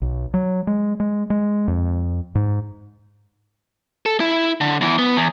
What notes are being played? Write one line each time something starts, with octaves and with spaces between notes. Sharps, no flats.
B1
F#3
G#3
G#3
G#3
F2
G#2
A4
E4
D3
E2 E3
B3
E2